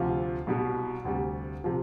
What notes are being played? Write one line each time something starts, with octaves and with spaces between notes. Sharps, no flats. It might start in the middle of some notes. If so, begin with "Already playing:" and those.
Already playing: D2 C3 F3 F5
C2 B2 G3
D2 C3 G3
C3 F3